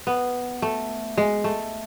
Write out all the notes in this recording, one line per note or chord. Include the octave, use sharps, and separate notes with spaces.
B3
A3
G#3
A3